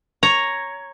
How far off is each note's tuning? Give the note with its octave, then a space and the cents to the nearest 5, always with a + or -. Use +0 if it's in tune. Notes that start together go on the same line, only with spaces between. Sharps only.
C#5 +0 A#5 +0